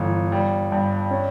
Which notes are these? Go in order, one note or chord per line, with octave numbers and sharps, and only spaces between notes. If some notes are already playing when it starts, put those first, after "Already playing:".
Already playing: G1 E3
G3
G2
C#4